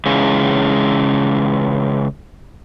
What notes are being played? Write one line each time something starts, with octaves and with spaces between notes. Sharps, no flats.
C#3 E3 G#3